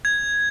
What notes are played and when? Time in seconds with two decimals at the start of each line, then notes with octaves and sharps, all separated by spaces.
0.05 G#6